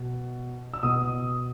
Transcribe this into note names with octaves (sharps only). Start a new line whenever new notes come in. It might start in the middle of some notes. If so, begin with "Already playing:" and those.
Already playing: B2
E6
B2 D#6